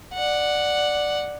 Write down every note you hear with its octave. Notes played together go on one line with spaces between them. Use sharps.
D5 F#5